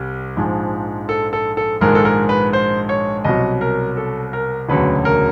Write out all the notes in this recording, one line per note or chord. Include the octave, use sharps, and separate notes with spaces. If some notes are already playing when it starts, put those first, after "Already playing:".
Already playing: C2 G3
A#1 G#2 F3 G#3
A4
A4
A4
A#1 G#2 D#3 G#3 A#4
A4
A#4
B4
C5
C#5
C2 B2 F#3 D#5
A#4
A4
A#4
E1 D2 C#3 F#3 B4
A#4